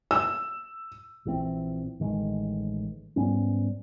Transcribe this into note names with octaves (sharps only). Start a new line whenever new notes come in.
E6
A#1 E3 F3 C4
A1 D#3 G#3
G#2 G3 B3 C#4